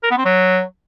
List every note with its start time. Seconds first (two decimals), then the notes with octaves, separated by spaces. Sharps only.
0.03 A#4
0.11 B3
0.18 C4
0.25 F#3